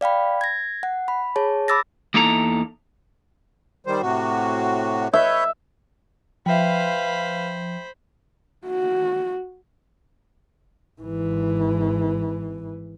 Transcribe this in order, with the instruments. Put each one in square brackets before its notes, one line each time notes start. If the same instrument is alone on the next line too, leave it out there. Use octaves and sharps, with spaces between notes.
[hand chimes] D5 F5 G5 B5
G#6 A#6
F#5
B5
G#4 C#5 A5
B5 D6 E6 A6 A#6
[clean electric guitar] E2 A#3 D#4 E4 A4 A#5
[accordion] D#3 G3 C5
A2 C3 F#4
[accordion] B4 C#5 G6 [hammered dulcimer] E5
[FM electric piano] F3 [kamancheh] B4 F5 [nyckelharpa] C5 B5 [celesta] E5 G5
[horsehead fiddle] F#4
[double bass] G#1 E3